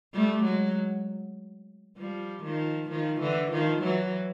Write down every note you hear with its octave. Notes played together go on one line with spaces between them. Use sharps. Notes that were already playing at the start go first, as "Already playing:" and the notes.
G3 A3
F#3 G#3
F3 G3
D#3 F3
D#3 F3
D3 E3
D#3 F3
E3 F#3